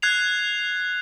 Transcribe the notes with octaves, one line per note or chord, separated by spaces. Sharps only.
F#6 G#6 C7 F7